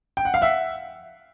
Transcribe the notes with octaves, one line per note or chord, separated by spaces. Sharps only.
G5
F#5
F5
E5 F#5